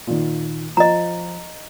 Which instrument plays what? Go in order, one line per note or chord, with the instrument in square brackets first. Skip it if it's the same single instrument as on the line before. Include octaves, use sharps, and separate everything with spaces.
[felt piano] A#2 D#3
[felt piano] F3 [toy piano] D#5 A#5